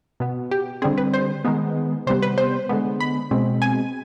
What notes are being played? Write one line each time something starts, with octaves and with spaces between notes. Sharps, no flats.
B2 B3
G4
D3 G3 C4 G#4
B4
C5
D#3 G#3 B3
C3 G3 B3 C5
B4
C5
D3 G#3 B3
B5
B2 G#3 C4
G#5